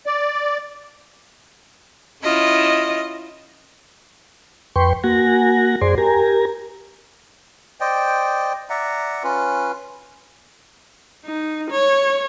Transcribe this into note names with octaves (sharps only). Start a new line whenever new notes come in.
D5
C#4 E4 F4 D#5
F2 B4 G5 C6 C#6
A#3 F#4 F#5 G#5 A#6
F#2 G#4 C5 D5 G#5 C6
G4 A#4 G#5 A#5
C5 D5 D#5 G5
D5 E5 F#5 A#5
C#4 F4 B4
D#4
C#5